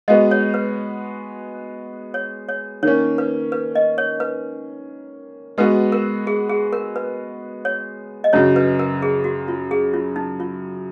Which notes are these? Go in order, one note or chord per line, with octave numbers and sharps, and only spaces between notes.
G#3 B3 F#4 D#5
C#5
B4
C#5
C#5
D#3 A#3 C#4 C#5
B4
B4
D#5
C#5
B4
G#3 B3 F#4 B4
A#4
G#4
G#4
A#4
B4
C#5
D#5
F#2 C#3 F#3 C#5
B4
A#4
G#4
F#4
F4
G#4
F4
D#4
F4